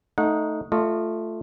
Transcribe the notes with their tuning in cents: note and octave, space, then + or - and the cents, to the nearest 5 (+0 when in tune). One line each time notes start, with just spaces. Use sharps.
A3 +0 D#4 +0 F#5 -30
A3 +0 F4 +0 D#5 -35